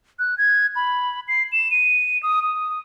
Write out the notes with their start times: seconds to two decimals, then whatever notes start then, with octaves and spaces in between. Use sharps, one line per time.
0.19 F#6
0.38 G#6
0.76 B5
1.28 C7
1.52 E7
1.71 D#7
2.23 D#6
2.43 D#6